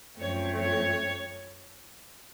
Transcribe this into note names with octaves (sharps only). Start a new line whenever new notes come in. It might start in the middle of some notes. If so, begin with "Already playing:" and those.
F#2 F3 A3 C4 C#5
C#5